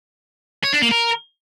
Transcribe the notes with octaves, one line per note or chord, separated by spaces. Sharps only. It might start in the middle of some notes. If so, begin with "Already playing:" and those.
C#5
D4
A#3
A#4